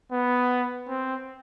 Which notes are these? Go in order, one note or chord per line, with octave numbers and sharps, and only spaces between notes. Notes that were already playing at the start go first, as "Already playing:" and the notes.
B3
C4